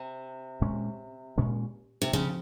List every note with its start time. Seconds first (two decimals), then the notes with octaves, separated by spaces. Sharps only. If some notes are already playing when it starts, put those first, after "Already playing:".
Already playing: C3
0.61 A#2 G#3 C#4
1.38 A#2 G#3 C#4
2.02 C3
2.13 C#3 F3 C4